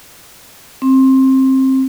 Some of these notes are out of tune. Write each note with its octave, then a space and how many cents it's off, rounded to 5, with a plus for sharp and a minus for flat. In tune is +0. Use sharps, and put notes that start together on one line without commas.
C4 +20